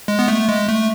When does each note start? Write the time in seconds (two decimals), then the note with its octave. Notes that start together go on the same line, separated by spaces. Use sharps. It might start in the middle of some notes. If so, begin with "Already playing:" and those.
0.08 G#3
0.19 B3
0.28 A3
0.48 G#3
0.69 A3